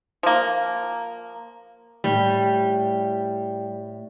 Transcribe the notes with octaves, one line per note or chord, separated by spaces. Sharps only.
F3 A#3
A2 G3